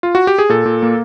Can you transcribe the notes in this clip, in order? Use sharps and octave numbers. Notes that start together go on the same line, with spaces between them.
F4
F#4
G4
G#4
A#2 A4
A#2
A#3